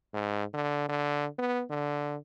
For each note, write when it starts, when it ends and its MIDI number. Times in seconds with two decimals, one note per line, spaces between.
0.14 0.44 44
0.54 0.85 50
0.89 1.27 50
1.39 1.63 59
1.70 2.16 50